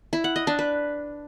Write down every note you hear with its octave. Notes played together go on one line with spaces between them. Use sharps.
E4
F#5
D#5
D4
B4